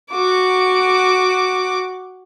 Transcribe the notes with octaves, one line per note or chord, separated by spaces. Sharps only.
F#4 D6